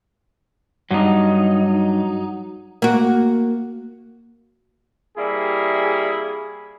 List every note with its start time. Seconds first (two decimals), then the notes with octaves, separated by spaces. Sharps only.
0.91 G2 F#3 D#4
2.82 A#3 F#4
5.16 C3 G3 A#3 E4 G#4